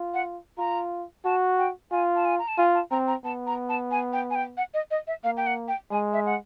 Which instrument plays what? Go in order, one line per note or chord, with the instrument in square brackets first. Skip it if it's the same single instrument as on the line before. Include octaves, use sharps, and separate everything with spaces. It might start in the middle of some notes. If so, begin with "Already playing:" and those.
Already playing: [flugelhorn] F4
[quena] F#5
[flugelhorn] F4 [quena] A#5
[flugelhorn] F#4 [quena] A5
[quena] G5
[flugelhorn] F4 [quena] G#5
[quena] A5
G#5
A#5
A5
[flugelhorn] F4 [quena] G#5
[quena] A5
[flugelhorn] C4 [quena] A#5
[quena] A#5
[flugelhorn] B3 [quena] A5
[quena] A#5
A5
G#5
G5
G#5
G5
F#5
D#5
D#5
E5
[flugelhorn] A#3 [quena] F5
[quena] G5
F#5
G5
[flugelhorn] G#3 [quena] G#5
[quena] E5
F#5